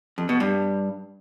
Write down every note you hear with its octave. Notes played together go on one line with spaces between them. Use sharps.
F2
B2
G2